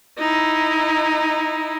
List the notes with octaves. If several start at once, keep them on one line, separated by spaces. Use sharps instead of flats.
D#4 E4